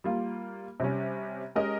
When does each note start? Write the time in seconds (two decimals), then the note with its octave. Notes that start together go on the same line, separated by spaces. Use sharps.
0.04 G3 A#3 F4
0.80 C3 G3 C#4
1.55 G#3 C#4 G4 A#4 D#5